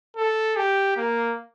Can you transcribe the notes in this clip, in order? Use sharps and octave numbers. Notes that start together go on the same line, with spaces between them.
A4
G4
A#3